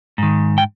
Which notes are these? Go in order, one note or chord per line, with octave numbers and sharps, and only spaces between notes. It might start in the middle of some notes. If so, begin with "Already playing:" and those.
G#2 D#3
G5